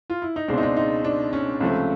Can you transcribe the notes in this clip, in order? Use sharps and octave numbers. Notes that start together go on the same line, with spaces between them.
F4
E4
D#4
C#2 B2 G#3 C4 D4
D#4
D4
D#4
D4
C#4
C#2 C3 F3 A3